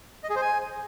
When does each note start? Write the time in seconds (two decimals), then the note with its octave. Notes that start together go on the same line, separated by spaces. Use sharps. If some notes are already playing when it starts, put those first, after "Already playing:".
0.24 D#5
0.30 G#4
0.36 C5
0.42 G#5